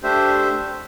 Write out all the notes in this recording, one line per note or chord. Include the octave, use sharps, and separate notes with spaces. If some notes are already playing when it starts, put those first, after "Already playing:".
A3 D4 G4 C5 E5